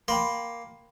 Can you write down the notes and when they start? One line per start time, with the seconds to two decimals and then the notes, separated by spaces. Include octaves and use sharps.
0.08 A#3 G5 B5 C6